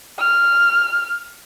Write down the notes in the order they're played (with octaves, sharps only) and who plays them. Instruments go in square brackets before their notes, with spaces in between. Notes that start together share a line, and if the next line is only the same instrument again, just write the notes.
[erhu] F6